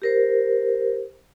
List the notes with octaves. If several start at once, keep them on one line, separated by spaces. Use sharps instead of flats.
G4 A#4 C5